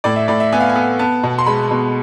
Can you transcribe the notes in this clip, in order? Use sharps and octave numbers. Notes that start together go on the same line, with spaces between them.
A2 D5
E5
A2 D5
E5
B3 G#5
F5
G#5
B3
B3 A5
B2
C6
G#3 B5
B2